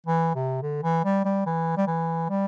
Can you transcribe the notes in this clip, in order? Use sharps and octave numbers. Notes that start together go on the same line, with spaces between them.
E3
C3
D3
E3
G3
G3
E3
G3
E3
G3